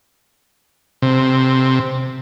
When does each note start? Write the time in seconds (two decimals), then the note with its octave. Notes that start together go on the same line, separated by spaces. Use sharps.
1.02 C3